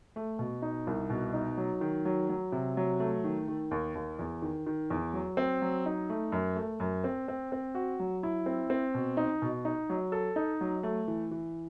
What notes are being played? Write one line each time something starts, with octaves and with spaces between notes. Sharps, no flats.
A3
B2
D#4
C2
B2
D#4
F#3
D#3
F#3
F#3
C3
F#3
A3
D#3
D#3
D#2
D#2
E2
D#3
D#3
E2
F#3
C4
F#3
D#4
A3
F#2
A3
F#2
C4
C4
C4
F#4
F#3
E4
C4
C4
B2
D#4
B2
D#4
F#3
A4
D#4
F#3
A3
E3
E3